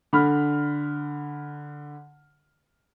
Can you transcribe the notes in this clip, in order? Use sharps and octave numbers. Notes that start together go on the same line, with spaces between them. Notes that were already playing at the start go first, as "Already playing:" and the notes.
D3 B5 F6